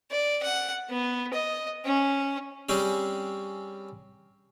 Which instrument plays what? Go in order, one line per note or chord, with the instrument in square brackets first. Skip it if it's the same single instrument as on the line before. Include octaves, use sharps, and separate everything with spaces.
[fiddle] D5
F#5
B3
D#5
C#4
[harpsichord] G3 C4 C#4 G#4